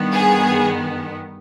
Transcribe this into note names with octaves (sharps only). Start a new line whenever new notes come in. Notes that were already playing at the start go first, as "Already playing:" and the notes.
Already playing: G2 D#3 B3
G#4